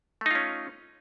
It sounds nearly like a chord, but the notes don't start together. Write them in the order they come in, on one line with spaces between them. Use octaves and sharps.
A3 D#4 F4 C#4